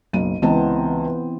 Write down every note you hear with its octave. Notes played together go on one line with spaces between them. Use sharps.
F#1 B1 D#7
C#2 E3 B3 C4 D#5 A5